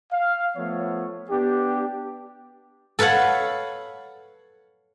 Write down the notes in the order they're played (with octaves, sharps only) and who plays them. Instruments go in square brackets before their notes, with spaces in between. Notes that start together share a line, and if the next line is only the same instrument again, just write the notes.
[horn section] F5
F3 A3 B3 C#5
B3 D4 G4
[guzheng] A4 B4 C#5 F5 F#5